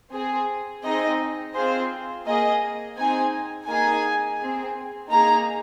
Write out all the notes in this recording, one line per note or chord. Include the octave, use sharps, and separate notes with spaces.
C4 G#4
C4 D#4 G#4 D#5
C4 F4 G#4 C5
A#3 G#4 D#5
C4 D#4 G#4 G#5
A#3 D#4 G#4 G#5
C4 G#4
A#3 D#4 G#4 A#5